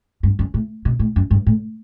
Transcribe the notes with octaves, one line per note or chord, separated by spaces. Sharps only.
G2
F#2
A2
B2
A2
F#2
G2
A2